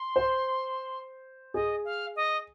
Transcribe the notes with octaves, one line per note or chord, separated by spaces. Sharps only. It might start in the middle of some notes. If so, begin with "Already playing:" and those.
Already playing: C6
C5
G#4 D#5
F5
D#5